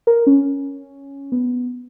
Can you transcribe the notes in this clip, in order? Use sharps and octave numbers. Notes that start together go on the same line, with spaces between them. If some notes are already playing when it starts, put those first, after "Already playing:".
A#4
C#4
B3